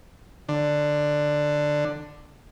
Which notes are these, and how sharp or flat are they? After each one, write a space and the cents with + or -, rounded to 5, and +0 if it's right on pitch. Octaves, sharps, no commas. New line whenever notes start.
D3 +10